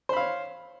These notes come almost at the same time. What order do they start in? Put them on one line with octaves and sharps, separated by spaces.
C5 B5 F5 C#5